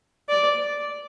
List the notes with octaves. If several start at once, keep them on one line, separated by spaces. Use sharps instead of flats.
D5